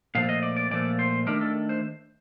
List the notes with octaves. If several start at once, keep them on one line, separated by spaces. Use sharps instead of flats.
A#2 F3 A3 F5
D#5
D5
D5
A#2 F3 A3 D5
C5
D#3 A3 D4 A#4
A4
C5